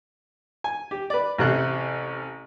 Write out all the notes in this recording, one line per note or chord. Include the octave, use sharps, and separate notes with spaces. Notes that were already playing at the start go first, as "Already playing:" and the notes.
G#5
G4
B4 D5
A1 C3 F#6